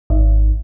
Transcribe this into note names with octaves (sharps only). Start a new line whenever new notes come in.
G#1